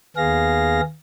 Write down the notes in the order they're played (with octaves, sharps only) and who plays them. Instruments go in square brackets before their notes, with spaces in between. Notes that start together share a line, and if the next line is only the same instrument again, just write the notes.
[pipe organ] D#2 B3 G#4 F5 A#6